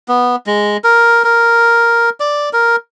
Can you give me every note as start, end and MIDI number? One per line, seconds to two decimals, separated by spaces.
0.08 0.36 59
0.47 0.77 56
0.84 1.24 70
1.24 2.10 70
2.20 2.49 74
2.53 2.76 70